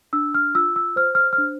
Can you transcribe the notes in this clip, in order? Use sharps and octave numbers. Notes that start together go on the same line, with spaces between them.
D4 E6
F6
F4 E6
E6
C5 F6
F6
F6
D4